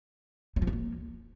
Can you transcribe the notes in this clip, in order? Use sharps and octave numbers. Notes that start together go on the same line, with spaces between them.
F#3
F3
D4
A#3